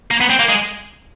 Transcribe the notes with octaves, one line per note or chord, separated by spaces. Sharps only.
A#3
B3
C4
A#3
G#3